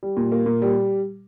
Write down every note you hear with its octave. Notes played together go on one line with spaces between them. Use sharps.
G3
A#2
A#3
A#2
G3